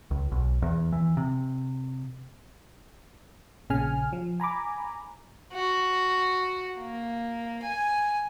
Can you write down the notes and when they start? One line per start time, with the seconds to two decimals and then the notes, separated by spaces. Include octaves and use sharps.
0.11 C#2
0.32 B1
0.62 E2
0.92 E3
1.17 C3
3.70 A#1 C#3 G#5 F6
4.13 F3
4.40 G#5 A#5 B5 D6
5.53 F#4
6.79 A#3
7.63 G#5